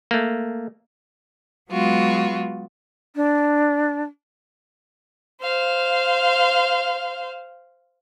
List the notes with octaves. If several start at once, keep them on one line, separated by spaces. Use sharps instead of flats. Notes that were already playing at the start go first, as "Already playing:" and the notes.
A3 A#3
F#3 G#3 B3 F4 F#4
D4
C5 F5